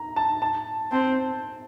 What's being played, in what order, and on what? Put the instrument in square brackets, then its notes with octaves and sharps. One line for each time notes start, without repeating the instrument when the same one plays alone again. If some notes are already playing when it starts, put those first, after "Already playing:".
Already playing: [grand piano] A#5
A5
A5
[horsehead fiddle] C4 [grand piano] A5